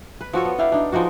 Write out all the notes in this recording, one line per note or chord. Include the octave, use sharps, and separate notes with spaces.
B4
F3 F#4 A4 C#5
B3
D4 E4 F5 G5
D4 D#4
F3 G#3 D#4 F#4